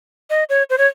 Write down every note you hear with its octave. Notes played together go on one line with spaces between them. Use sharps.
D#5
C#5
C5
C#5